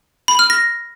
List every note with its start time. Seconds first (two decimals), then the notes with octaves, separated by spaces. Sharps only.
0.28 B5
0.39 F6
0.50 A#6